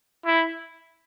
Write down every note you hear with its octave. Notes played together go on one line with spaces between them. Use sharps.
E4